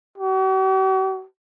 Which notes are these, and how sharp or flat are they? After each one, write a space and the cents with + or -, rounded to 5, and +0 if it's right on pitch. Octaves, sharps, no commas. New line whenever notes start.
F#4 +45